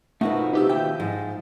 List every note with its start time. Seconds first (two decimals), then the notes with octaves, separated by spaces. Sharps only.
0.21 B2 F3 A3 D#4 F#4 A#4 E5
0.53 C3 D#4 G4 B4 E6
0.69 D#2 F4 E5 G5 G6
1.00 G#2 F3